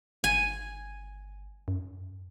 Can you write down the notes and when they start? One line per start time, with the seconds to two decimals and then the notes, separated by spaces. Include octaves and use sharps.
0.24 G1 G#5
1.68 F#2